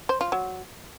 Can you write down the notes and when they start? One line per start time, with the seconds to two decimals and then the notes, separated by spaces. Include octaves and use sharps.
0.09 C5
0.21 F4
0.32 F#3